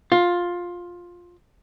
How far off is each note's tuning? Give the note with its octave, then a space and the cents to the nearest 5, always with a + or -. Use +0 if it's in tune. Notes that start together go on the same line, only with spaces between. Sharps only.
F4 +10